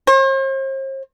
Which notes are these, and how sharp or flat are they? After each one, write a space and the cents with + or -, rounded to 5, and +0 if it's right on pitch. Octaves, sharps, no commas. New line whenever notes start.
C5 +45